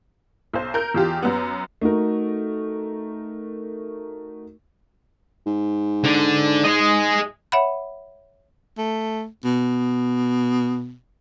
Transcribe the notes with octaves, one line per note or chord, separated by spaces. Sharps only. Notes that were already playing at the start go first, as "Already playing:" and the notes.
B1 C5
A#4 G6
E2 F4 G4
F#2 B3
A3 D#4 F#4 A#4
G#2
D3
G#4 D#5
C#5 E5 F#5 B5
A3
B2